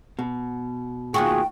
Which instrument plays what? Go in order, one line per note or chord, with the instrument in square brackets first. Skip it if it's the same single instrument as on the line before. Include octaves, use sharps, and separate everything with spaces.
[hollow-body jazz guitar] B2
[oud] D#2 F4 F#4 [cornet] G#4 [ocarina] G5